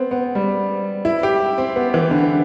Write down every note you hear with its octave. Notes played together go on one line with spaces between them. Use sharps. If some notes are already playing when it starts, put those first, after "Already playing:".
Already playing: B3 C4
B3
G3
E4
G4
C4
B3
E3
D3